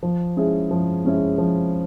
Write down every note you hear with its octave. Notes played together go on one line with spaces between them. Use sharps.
F3
G#3 C#4 E4 G#4
F3
G#3 C#4 E4 G#4
F3